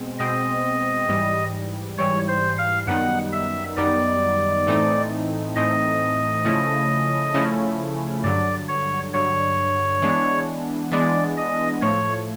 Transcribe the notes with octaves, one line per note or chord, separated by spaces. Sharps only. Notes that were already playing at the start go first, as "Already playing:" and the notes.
Already playing: B2 G#3 C4
B2 G#3 C4 D#5
G#2 E3 G3
G#2 E3 G3 C#5
C5
F5
F#2 D#3 G3 B3 D#4 F#5
E5
F#2 D#3 G3 B3 D#4 D5
A2 E3 A3 C4 D#4
A2 E3 A3 C4 D#4 D#5
C#3 F3 A3 C#4 E4
C#3 F3 A3 C#4 E4
G2 D3 F#3 D5
C#5
G2 D3 F#3 C#5
E3 G#3 B3 D4
E3 G#3 B3 D4 D5
D#5
A2 F3 A3 C#5